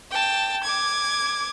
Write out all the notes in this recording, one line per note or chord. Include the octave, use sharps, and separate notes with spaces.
G5 A5
D6 G#6